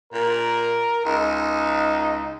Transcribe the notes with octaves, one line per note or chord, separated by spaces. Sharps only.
A#2 A#4
C#2 D#4